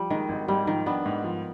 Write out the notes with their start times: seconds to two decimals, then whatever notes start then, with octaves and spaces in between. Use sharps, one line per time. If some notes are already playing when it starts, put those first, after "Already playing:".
Already playing: F3 G3
0.10 D#3 G#3
0.29 G#1
0.48 G#2 G3
0.67 D#3 F3
0.86 B3 D4
1.06 G#2
1.24 F3